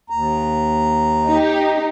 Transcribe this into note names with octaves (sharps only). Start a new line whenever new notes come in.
D#2 A#5
D#4 G4